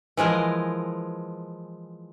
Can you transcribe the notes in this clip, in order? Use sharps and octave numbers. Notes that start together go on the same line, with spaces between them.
E3 F3 G#3 A#4